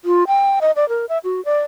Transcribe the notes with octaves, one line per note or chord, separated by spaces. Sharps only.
F4
G5
D#5
D5
A#4
E5
F#4
D5